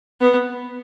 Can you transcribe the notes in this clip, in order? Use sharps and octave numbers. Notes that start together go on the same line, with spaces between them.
B3